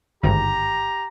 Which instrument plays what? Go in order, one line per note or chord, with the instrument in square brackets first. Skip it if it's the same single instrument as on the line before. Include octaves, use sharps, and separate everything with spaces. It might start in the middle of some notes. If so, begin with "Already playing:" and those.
[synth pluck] G#1 D2 G2 [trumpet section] G4 A#5